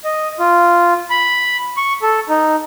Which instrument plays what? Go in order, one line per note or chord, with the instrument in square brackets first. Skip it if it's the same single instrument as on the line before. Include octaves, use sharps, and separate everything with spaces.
[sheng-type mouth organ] D#5
F4
B5
C#6
A4
D#4